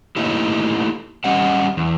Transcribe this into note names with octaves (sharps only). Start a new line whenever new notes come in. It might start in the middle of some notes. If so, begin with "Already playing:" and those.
A3 A#3 D#4 E4 G4
G3 C#4 G4 D#5 F#5
E2